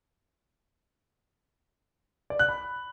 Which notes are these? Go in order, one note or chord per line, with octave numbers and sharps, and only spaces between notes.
D5
F#6
B5